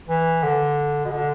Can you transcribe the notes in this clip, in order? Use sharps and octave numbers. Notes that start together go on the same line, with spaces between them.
E3
D3
B2
D3